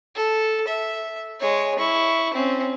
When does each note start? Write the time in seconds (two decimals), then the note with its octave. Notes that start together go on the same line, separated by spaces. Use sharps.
0.15 A4
0.67 E5
1.40 G#3 C#5
1.79 E4 C#6
2.34 C4 C#4